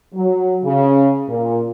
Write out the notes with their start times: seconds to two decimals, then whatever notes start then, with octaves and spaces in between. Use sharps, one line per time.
0.14 F#3
0.64 C#3
1.28 A#2